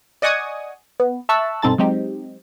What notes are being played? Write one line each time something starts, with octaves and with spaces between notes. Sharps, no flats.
D5 D#5 F#5 G#5 C#6 D#6
B3
E5 A5 C#6 E6 F#6
G2 B2 C4 D#4 A4 A6
F#3 G#3 C4 D#4 G4